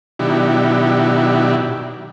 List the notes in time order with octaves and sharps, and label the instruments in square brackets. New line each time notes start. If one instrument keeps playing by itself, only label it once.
[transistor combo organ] B2 D#3 F#3 D4 E4 G4